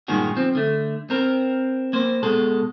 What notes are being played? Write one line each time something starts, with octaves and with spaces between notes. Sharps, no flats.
G2 A#2 D#3 G#3 C#4 F#4
F3 C4
D3 A3
C4 A#4
A#3 C5
B2 G#3 A4